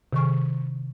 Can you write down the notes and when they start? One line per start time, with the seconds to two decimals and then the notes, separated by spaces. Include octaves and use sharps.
0.13 C3 D#3 C#6